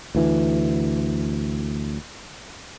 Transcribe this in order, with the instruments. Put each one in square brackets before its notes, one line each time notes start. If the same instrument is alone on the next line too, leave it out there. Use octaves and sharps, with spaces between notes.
[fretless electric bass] D2 E3